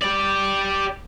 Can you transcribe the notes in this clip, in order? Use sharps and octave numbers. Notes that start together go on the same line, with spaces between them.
G4 D5